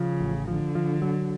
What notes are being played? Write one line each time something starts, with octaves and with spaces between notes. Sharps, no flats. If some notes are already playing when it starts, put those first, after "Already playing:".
Already playing: C#3 F3
A1
D3 F3
F3
F#3